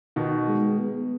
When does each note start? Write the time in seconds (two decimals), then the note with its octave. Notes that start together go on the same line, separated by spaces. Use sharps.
0.16 B2 D#3
0.48 G#3
0.79 B3